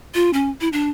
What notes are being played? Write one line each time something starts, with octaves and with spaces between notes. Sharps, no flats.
F4
C#4
E4
D4